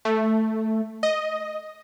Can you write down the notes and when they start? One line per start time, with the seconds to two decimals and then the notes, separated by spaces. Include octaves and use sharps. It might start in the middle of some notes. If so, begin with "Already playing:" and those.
0.05 A3
1.03 D#5